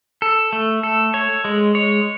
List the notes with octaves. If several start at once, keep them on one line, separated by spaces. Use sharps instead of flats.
A4
A3
A4
C#5
G#3
C#5